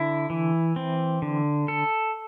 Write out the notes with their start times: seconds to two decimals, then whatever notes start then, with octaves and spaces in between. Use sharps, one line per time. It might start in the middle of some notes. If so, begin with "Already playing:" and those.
Already playing: D3 E4
0.30 E3
0.76 C4
1.22 D3
1.68 A4